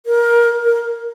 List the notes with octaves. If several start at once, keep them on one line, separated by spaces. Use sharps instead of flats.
A#4
A#4